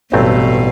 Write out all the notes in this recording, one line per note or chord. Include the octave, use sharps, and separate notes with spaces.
A1 G2 B2 F#3 A3 C4